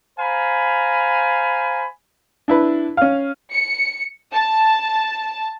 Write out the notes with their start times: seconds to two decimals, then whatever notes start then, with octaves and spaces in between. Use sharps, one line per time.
0.19 C5 F5 G#5 A#5 B5
2.48 D4 E4 B4
2.97 C#4 F5
3.53 C#7
4.33 A5